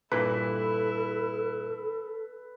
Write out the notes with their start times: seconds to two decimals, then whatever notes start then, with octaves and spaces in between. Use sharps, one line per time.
0.12 G2 A#2 E3 E4 A4 B4